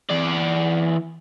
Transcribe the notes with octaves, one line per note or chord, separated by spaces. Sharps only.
E3 D5